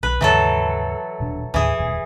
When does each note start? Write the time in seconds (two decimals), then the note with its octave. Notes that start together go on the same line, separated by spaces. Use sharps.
0.03 B1 B4
0.21 D#2 G#2 C#3 E3 F#3 A4
1.20 D#1 B2 D4
1.54 D#2 A2 E3 G#4
1.79 D#1 F#2 B2